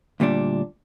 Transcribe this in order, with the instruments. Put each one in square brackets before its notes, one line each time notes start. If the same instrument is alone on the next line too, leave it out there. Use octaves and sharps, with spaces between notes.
[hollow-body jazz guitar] D2 A#2 G3 D4